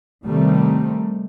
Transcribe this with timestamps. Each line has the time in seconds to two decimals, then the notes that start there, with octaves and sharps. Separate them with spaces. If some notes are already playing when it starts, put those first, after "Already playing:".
0.25 C3 D#3 G3 A3 C4